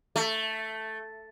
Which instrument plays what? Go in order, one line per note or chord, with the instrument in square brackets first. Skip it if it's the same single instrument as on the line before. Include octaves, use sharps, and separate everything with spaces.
[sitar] A3